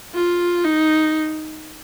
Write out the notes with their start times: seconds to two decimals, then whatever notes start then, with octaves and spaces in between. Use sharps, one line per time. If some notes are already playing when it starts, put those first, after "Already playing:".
0.14 F4
0.64 D#4